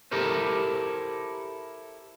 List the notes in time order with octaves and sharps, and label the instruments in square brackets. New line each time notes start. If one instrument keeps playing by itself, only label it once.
[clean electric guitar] E4 G4 A4 A#4 C5